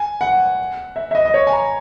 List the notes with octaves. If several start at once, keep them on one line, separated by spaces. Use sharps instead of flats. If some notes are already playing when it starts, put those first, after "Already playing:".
Already playing: G#5
F#5
E5
E5
D#5
D#5
C#5
G#5
A#5